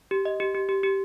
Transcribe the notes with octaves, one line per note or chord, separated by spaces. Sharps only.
G4
D#5
G4
G4
G4
G4